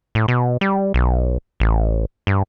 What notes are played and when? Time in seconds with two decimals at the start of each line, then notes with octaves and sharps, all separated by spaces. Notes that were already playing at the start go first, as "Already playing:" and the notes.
0.15 A2
0.28 B2
0.61 G3
0.94 B1
1.60 A1
2.27 G2